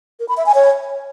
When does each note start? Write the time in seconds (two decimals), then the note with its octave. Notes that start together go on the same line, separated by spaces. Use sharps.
0.20 A#4
0.28 B5
0.37 E5
0.46 G#5
0.55 C#5